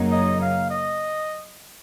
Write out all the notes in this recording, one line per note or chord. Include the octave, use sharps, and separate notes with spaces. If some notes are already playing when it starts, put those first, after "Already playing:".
Already playing: F#2 C#3 F#3 A#3 D#4
D#5
F5
D#5